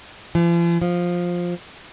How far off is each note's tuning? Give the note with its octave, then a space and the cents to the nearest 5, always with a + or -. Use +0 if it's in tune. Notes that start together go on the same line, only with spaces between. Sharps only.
F3 -45
F3 +10